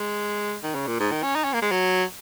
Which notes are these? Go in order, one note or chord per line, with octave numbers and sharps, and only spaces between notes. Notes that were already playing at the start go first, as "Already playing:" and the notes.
Already playing: G#3
D#3
C#3
A#2
G#2
D#3
C#4
D#4
C#4
A#3
G#3
F#3